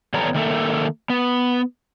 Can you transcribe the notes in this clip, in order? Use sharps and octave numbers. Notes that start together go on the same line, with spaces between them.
E2 G3 B3 A4 C#5 A#5
D#3 A#3 A4 E5
B3